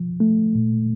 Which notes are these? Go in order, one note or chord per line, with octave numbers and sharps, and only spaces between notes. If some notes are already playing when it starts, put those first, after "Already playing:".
Already playing: F3
A3
A#2